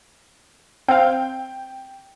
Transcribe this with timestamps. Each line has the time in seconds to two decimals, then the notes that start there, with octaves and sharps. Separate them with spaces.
0.88 C4 F5 G5